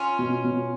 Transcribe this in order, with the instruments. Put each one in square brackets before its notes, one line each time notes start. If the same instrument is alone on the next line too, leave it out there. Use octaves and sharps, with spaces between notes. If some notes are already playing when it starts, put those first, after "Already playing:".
Already playing: [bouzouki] C#4 F4
[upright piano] B2
B2